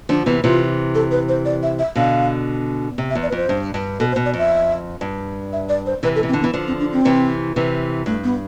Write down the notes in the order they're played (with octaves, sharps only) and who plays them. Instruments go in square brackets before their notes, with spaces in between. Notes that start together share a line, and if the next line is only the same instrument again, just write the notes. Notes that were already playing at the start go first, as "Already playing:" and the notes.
[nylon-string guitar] D3 F3 [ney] D4
[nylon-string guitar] C3 E3 [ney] B3
[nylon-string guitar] C3 E3 [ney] F4
[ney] A4
B4
C5
D5
E5
E5
[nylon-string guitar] B2 D3 [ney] F5
[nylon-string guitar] C3
[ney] E5
[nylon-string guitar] E2
[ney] D5
B4
[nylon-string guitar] F2 [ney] C5
[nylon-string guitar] G2
G2
[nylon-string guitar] B2 [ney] A4
[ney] C5
[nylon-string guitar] B2
[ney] D5
[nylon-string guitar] F2 [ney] E5
[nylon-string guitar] G2
[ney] E5
D5
C5
[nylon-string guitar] C3 E3 [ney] B4
[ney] A4
[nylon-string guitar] C3
[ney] C4
[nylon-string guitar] D3
[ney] B3
[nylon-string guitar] E3
D3 F3
[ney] C4
D4
C4
[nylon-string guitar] C3 E3
C3 E3
[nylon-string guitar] G2 [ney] A3
[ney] B3